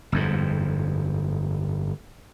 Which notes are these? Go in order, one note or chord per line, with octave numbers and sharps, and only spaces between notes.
G1 F2 G#2